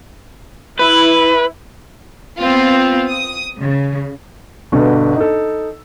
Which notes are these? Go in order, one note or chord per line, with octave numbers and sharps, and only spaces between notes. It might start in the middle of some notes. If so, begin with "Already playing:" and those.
E4 B4
B3 C4 F4
D#6
C#3
G1 G2 B2
D#4 A4